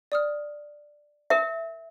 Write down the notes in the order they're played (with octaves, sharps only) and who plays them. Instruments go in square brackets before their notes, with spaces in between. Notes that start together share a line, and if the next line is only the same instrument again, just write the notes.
[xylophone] D5 D#6 F6
[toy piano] A#4 E5